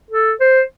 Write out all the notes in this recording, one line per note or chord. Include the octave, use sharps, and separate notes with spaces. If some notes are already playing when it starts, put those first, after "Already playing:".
A4
C5